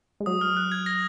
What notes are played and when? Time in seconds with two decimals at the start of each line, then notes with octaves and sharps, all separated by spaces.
0.20 G#3
0.26 F#3 D#6
0.41 F6
0.57 F#6
0.72 G#6
0.86 A#6